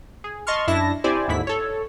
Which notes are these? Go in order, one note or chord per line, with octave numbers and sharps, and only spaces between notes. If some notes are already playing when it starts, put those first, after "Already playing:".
G#4
D#5 A5 C6 C#6 F6
F#2 D4 E4 E5 A5 A#6
C4 E4 G4 C5 D5 G#5
D#2 G#2 D3 E4 B6
A4 C#5